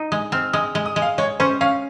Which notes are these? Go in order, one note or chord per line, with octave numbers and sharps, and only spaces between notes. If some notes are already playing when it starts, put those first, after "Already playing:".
Already playing: D#4
G#3 D#6
C4 F6
G#3 D#6
G#3
D#6
G#3
F5
G#3 C#5
C#4 C5
C#4 F5